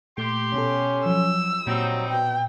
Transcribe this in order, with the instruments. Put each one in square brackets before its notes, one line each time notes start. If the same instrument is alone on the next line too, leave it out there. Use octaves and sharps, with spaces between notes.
[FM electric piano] A#2 A3 [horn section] G4 C6
[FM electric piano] B2 A4 [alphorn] C#4
[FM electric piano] F3 F#3 [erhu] E6
[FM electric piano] A#2 [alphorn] F#3 [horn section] G3 C4 D#4
[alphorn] B2 [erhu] G5